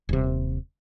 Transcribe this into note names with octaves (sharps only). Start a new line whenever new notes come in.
D#1 C3